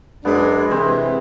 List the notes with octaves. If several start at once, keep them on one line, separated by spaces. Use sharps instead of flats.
F#2 G#3 B3 D4 B5
C3 E3 C4